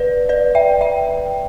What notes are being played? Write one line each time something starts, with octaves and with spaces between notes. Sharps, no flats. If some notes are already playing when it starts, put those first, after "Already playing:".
Already playing: B4 D5
B4 D5
E5 G5
E5 G5